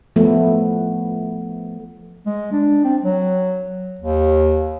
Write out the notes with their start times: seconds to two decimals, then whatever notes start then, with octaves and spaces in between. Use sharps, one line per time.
0.16 F3 A3 B3
2.26 G#3
2.52 D4
2.84 C4
3.03 F#3
3.99 D#2